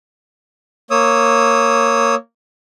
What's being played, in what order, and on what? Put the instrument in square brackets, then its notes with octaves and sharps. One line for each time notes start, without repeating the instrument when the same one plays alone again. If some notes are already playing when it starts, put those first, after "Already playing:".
[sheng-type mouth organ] A#3 C#5 D#6 E6